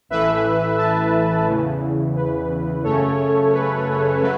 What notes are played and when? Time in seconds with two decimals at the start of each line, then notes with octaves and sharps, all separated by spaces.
0.09 A1 A2 E3 A3 B4 E5
0.78 E5 A5
1.47 E2 C#3 E3
2.16 B4
2.84 F#2 C#3 A3 C#4 A4 C#5
3.53 B4
4.22 F#3 A3 B4